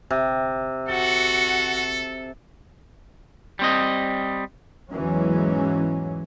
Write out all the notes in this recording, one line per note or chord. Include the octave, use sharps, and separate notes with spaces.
G1 C3
G1 F#4 A4 F#5
G3 C4 D#5
E2 G#2 E3 F#3 G#3 C#4